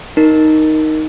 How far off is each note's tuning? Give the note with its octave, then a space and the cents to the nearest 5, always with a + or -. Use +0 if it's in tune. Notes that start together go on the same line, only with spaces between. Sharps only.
D#4 +0 A#4 +0